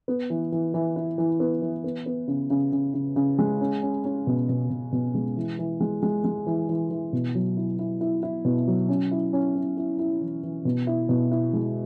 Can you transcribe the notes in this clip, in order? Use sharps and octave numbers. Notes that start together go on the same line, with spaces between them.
B3
E3
E3
E3
E4
E3
B3
E3
B3
B3
C#3
C#3
C#3
C#3
C#3
G#3
C#4
C#4
C#4
B2
B2
B2
B2
G#3
E3
E3
G#3
G#3
G#3
E3
E3
E3
B2
F#3
E4
E4
E4
E4
B2
F#3
C#4
E4
C#4
E4
E4
E4
E3
E3
B2
E4
B2
E4
G#3